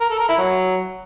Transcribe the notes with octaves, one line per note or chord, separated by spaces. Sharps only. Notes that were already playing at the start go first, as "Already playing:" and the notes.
A#4
A4
A#4
E4
F#3